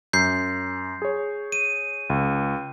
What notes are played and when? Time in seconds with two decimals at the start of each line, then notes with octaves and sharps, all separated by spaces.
0.13 F#2 G6 C7
1.02 G#4 C#5
1.52 D#7
2.10 C#2